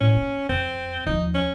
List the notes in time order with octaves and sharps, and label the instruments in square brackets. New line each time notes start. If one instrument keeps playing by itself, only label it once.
[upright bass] A2 [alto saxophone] C#4
[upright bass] A#3
[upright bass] F2 [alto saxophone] C4
[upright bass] D#2 F3 [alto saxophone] D#4
[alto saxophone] C#4